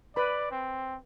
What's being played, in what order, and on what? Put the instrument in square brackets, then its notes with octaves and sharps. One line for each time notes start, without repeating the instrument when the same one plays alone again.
[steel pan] B4 B5 [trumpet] D5
[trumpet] C4